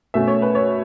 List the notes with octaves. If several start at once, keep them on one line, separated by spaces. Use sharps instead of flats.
B2 A3 C#4 E5
C#5
B4
C#5